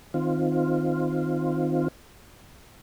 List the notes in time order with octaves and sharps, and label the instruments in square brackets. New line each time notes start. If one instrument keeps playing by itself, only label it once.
[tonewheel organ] D#3 C4 F4